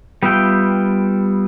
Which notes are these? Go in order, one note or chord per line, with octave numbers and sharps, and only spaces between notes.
G3 B3 F4 E5 G5